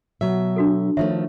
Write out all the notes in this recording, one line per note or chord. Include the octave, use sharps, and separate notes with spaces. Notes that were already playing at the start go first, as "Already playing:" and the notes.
B2 F#3 E5
D4 F#4 A4
D#3 F3 A3 C#5 E5